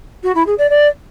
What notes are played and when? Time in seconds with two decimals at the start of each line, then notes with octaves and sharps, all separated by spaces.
0.23 F#4
0.35 E4
0.46 G#4
0.58 D5
0.70 D5